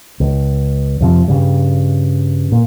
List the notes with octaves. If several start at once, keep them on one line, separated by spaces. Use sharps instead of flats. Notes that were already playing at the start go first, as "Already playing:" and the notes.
C#2
F2 C3 F3
G2 C#3 G3
A#2